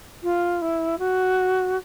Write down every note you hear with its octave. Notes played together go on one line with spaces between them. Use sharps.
F4
E4
F#4